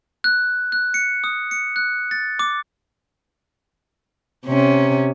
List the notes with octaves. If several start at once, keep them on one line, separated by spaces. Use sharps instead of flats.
F#6
F#6
C#7
D#6
C#7
F#6
A6
D6
C3 C#4